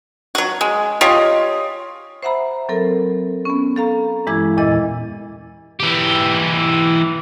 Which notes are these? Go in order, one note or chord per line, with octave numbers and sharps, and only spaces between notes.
F#3 F#4
G#3
F4 G4 C#5 D#5
C5 E5 F#5 A#5 B5
F#3 C4 A4 A#4
B3 C#4
A4 F5 A#5
G2 E3 G#3 E4 D6 G#6
E2 A#2 E3 E4 D#5 A6
E3 G4